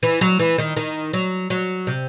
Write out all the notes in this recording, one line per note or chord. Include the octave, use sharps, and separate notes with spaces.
E3
F#3
E3
D#3
D#3
F#3
F#3
C3